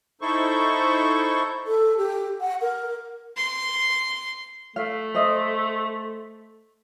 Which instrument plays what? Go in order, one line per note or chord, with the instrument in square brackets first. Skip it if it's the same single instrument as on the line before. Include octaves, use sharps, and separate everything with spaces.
[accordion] D#4 E4 A4 C5 C#6
[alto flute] A4
G4
F#5
A#4
[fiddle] C6
[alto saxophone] A3 [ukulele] F5
[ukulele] C5 D#5 E5